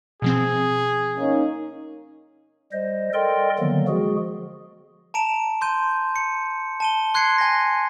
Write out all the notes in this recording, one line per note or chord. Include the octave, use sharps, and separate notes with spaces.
B2 F3 C4 G#4
A#3 C#4 D#4
G3 C5 D#5
A4 A#4 D5 D#5 G5 C6
D3 D#3 F3 F#3 A#3 B3
F3 G#3 F#4 G#4
A5 A#5 D7 E7
C6 G6 D#7
C#7
A5 D#7 G7
C6 F#6 G#6 C7 C#7
G#5 A#6